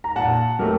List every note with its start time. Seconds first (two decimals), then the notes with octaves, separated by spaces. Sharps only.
0.04 A#5
0.16 A#2 F#5 A5
0.59 F#3 A3 G4 A#4